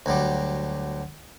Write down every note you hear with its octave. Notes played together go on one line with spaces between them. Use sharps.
D2 F#3 G3